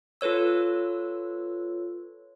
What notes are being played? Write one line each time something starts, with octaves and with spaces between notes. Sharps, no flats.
F4 A4 B4 C#5 E6